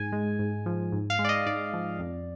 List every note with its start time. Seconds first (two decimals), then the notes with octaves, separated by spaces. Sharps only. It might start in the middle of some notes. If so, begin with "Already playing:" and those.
Already playing: G#2 G#5
0.12 G#3
0.39 G#2
0.66 F3
0.92 G#2
1.10 F5
1.19 G#3
1.25 D5
1.29 D#5
1.46 G#2 D5
1.74 F3
1.99 F2